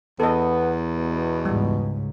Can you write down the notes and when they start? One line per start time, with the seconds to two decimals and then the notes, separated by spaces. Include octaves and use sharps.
0.20 E2 B3 A4 D#5
0.96 B2
1.45 C#2 G#2 C#3 G3